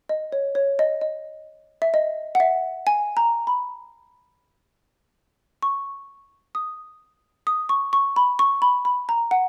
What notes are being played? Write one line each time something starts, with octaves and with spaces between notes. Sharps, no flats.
D#5
C#5
C#5
D#5
D#5
E5
D#5
F#5
E5
G#5
A#5
B5
C#6
D#6
D#6
C#6
C#6
B5
C#6
B5
B5
A#5
F#5